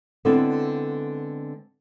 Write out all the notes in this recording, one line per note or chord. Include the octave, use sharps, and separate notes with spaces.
D3 G#3 B3 C4 E4 A4